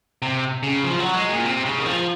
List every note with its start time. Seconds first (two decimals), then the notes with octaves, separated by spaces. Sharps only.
0.22 C3
0.63 C#3
0.84 F3
0.99 F#3
1.15 G#3
1.29 A#2
1.45 C3
1.64 C#3
1.78 D#3
1.86 F3